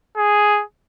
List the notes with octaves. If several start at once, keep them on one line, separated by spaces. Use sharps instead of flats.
G#4